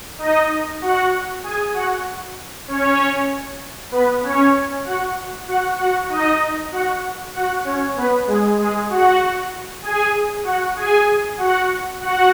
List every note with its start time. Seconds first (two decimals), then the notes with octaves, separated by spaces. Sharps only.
0.18 D#4 D#5
0.81 F#4 F#5
1.43 G#4 G#5
1.74 F#4 F#5
2.68 C#4 C#5
3.91 B3 B4
4.23 C#4 C#5
4.85 F#4 F#5
5.47 F#4 F#5
5.78 F#4 F#5
6.09 D#4 D#5
6.72 F#4 F#5
7.34 F#4 F#5
7.64 C#4 C#5
7.96 B3 B4
8.26 G#3 G#4
8.58 G#3 G#4
8.89 F#4 F#5
9.82 G#4 G#5
10.44 F#4 F#5
10.76 G#4 G#5
11.38 F#4 F#5
12.00 F#4 F#5